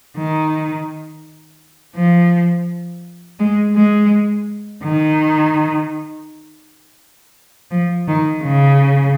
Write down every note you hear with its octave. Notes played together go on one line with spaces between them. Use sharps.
D#3
F3
G#3
G#3
D#3
F3
D#3
C#3